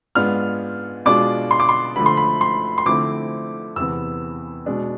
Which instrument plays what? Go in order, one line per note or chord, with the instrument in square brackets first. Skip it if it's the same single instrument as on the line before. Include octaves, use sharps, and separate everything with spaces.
[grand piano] G#2 G#3 B3 D4 F4 F6
B2 G#3 D4 F4 D6
C6
D6
C6
D3 F3 A3 B5
C6
B5
C6
C6
D3 F3 A3 C4 E4 D6
E2 C3 E3 B3 E6
B2 G#3 D4